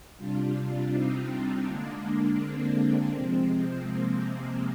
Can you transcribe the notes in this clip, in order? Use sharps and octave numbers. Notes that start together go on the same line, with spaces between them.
C3 G3 D4 F4
C4 D#4
D3 G#3 A#3 D4
C4
A#3
C3 F3 G#3 C4
A#3
C4